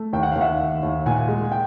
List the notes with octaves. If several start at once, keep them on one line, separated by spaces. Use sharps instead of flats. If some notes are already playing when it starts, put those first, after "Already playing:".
Already playing: A3
D#2 G5
F#5
D#2 F5
E5 F#5
D#2
D#2
A#2 F#5 G#5
G#3
G5